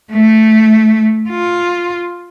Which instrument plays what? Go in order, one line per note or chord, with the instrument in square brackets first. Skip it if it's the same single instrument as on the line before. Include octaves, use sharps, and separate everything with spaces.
[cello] A3
F4